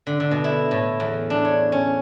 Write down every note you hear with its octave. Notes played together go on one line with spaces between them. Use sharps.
D3
D3
B2
E4
A2
E2
D4
C#5
C#4